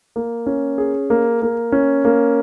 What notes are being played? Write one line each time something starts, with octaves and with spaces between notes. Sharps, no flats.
A#3
C#4
G#4
A#3
A#3
C#4
A#3